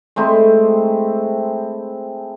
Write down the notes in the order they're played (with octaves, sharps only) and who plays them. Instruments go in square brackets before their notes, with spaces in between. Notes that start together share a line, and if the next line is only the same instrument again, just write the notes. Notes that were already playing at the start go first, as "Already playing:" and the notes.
[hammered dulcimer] G#3 A3 C4 E4